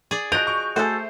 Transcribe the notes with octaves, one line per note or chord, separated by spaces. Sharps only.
G#4 D5
F3 F#4 D#5 G6 D7 F7
C#6
A3 F#4 G#4 A4 C5